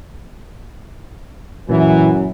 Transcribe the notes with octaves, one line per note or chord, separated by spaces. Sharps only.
F#2 A#2 E3